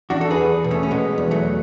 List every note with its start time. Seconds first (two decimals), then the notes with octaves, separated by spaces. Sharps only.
0.10 E2 D4 F#4
0.21 A4
0.30 G#4 B4
0.38 E2
0.64 B2
0.71 A3 C#4
0.83 C#4
0.91 B2 G#3 B3
1.18 E2
1.31 F#3 A3